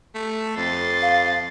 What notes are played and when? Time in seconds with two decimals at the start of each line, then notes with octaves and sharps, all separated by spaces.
0.15 A3
0.56 F2 C6 A6
1.02 F5